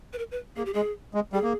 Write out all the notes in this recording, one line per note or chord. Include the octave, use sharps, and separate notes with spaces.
B4
A#4
B4
A#3 G#4
G4
G#3 G#4
G#3
G3 G#4
A#3